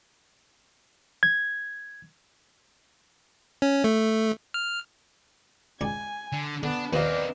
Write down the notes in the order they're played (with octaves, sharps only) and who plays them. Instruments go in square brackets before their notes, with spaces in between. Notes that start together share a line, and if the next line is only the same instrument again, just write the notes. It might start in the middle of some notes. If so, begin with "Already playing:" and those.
[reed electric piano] G#6
[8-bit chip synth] C#4
A3
F6
[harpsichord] C#2 D#4 D5 [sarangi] G#5
[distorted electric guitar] D3
[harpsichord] D3 [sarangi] B3 [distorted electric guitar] D4
[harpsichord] D#2 F3 [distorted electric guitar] C4 A#4 [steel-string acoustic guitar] B4 D#5 F5 [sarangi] D5